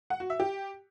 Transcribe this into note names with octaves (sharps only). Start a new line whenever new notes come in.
F#5
F#4
E5
G4